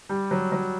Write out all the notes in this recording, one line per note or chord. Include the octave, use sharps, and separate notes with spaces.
G3
F#3
F#3